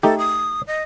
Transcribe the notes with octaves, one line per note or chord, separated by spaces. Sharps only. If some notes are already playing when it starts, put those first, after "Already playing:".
A3 D#4 G4 A4
D#6
D#5